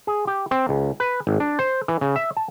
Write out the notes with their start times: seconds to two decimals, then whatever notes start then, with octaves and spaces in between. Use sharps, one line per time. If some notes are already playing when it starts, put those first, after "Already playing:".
0.07 G#4
0.27 G4
0.51 C4
0.69 C#2
1.00 B4
1.27 G#1
1.40 D4
1.59 C5
1.88 E3
2.01 C#3
2.16 E5
2.37 A5